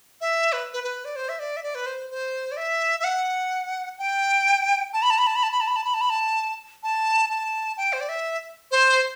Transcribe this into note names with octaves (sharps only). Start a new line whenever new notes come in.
E5
B4
B4
B4
D5
C5
E5
D5
E5
D5
B4
C5
C5
D5
E5
E5
F#5
G5
A5
B5
A5
B5
A5
B5
A5
B5
A5
B5
A5
B5
A5
B5
A5
A5
A5
G5
C5
D5
E5
C5